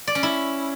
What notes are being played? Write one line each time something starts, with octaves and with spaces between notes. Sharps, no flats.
D5
C#4
E4